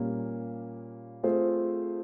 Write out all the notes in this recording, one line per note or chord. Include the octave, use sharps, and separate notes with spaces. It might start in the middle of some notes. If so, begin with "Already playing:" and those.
Already playing: A#2 G3 A#3 C#4
A3 C4 F4 G#4 C5